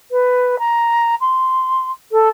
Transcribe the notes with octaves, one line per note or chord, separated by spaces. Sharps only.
B4
A#5
C6
A4